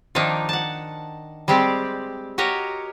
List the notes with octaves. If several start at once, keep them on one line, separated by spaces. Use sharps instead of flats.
D#3 F3 A#3 D4 D#4
F#5 A5
G3 G#3 C4 G4 D5
F#4 G4 A#4 C#5 D#5